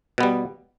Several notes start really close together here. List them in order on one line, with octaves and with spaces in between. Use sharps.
B2 B3 G3